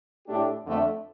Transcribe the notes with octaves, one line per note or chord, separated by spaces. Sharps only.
A2 A3 D4 G4
F2 D3 A3